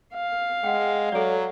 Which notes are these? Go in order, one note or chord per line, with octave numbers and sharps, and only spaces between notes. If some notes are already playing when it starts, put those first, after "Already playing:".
F5
G#3 F#5 G5
F#3 A4 D5